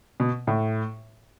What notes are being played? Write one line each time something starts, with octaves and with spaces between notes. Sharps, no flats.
B2
A2